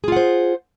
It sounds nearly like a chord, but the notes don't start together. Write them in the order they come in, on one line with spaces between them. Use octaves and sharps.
G#4 F4 F#5 C5